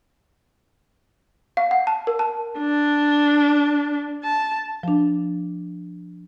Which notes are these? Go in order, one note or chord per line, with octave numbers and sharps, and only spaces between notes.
F5
F#5
A5
A#4
A5
D4
A5
F3 D4